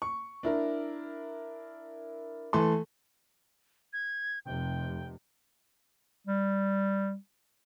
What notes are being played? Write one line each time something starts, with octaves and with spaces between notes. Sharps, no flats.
C#6
D4 E4 A#4
E3 A3 A4 C6
G#6
F1 C3 G5
G3